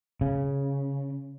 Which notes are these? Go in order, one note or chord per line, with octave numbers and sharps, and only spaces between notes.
C#3